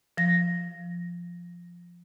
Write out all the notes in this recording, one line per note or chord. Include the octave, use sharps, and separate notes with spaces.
F3 A#6